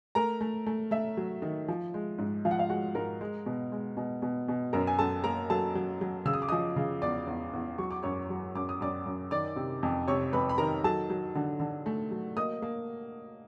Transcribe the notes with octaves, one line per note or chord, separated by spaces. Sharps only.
A3 A#4 A#5
A3
A3
A3 E5
F#3
D#3
F3
G#3
G#2
F3 F5
F#5
F5
G#3 F#4 F#5
G#2 A#4 A#5
G#3
B2
G#3
B2
B2
B2
F#2 A#4 A#5
G#5
F#2 A4 A5
A#3 A#4 A#5
F#3 A4 A5
F#3
F#3
C#3 E6
D#6
D6
F3 D#5 D#6
C#3
E2 D5 D6
E2
E2
F#3 C#6
D6
F#2 C#5 C#6
F#3
F#2 D6
D#6
F#2 D5 D6
F#2
D#3 D5 D6
C3
F2
C3 C#5 C#6
F2 B4 B5
B5
D#3 A#4 A#5
F#3 A4 A5
F#3
D3
D3
A3
F#3
A#3 D#5 D#6
A#3